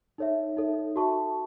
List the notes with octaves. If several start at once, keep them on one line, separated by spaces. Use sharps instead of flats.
D#4 A4 C#5 E5
D#4 A4 C#5 E5
F#4 A4 E5 A5 C#6